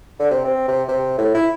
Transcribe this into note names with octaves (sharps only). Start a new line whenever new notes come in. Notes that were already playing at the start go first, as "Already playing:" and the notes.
D3
C3
C4
C3
C3
A2
E4